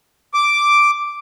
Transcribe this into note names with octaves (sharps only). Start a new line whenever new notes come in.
D6